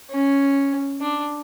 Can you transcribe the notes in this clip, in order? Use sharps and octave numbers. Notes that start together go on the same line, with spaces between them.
C#4
D4